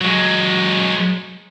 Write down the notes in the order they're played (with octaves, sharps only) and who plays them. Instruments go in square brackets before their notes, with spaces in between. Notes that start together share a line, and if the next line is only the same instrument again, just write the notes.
[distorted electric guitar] F#3 G#3